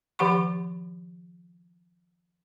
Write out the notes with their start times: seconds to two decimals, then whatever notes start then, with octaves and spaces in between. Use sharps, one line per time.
0.19 D#3 F3 G4 F#5 B5 C#6